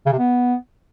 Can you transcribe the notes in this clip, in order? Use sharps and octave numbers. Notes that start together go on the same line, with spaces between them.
C#3
C3
B3